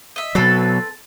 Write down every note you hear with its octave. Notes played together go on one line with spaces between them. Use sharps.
D#5 E5
B2 F#3 C4 A4 B4